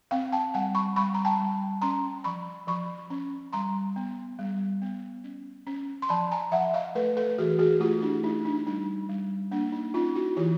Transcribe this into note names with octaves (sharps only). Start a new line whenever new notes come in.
C4 F5 G5
G5 A5
G3 F#5 G#5
B5 C#6
G3 B5 C#6
A#5
G5 A5
G3
C#4 A#5 C6
F3 B5 C#6
F3 B5 C#6
C#4
G3 A#5 C6
B3
G3
B3
C#4
C#4
C6
F3 A5 B5
G#5 A#5
F3 E5 F#5
D#5 F5
A3 A4 B4
A4 B4
E3 F#4 G#4
F#4 G#4
A3 F4 G4
D4 E4
A3 D#4
D4
G3 D#4
G3
A#3 D4
D#4
C#4 D#4 F4
E4 F#4
E3 F4 G4